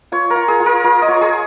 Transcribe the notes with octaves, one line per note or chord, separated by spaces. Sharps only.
F4 C#5
A#4
F4
G#4
F4
A#4
F4 A#4
D#5
F4 C#5
G#4